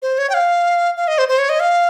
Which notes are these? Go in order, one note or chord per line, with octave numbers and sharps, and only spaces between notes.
C5
C#5
G5
F5
F5
D#5
C5
C5
C#5
D#5
F5